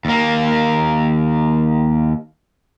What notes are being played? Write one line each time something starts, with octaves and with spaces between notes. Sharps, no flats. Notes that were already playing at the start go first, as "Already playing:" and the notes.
D#2 A#3